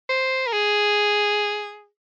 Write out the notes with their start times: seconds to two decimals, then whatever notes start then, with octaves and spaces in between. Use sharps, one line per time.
0.09 C5
0.47 A#4
0.53 G#4